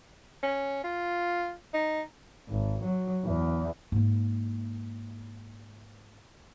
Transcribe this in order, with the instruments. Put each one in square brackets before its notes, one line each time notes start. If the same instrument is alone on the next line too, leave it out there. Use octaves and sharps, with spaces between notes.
[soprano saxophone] C#4
F4
D#4
[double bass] G#1
F#3
E2
[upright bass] G#2 A#3